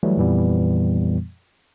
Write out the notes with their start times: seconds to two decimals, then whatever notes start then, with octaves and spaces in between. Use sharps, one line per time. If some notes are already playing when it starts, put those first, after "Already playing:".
0.03 E3 F#3 G3 A3
0.17 F2 A#2 E3 G3 B3